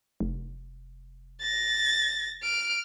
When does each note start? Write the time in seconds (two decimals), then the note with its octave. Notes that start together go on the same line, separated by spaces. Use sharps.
0.20 F1
1.41 A6 A#6
2.43 F6 D7